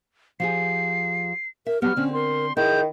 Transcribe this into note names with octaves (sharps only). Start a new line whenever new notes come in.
F3 G4 G#4 C7
A#4 E5
F#3 G3 B3 G4 F6
D3 C4 C#4
A#4 C6
D#3 E4 G#4 G6